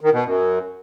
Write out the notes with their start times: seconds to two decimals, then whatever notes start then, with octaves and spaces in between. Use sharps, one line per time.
0.01 D#3
0.12 B2
0.24 F#2